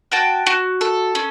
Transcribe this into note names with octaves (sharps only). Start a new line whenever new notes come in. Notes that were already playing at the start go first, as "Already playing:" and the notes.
F#4 G5 A5
F#4
A4
C#4